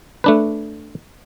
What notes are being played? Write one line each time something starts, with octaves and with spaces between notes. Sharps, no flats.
A3 D4 B4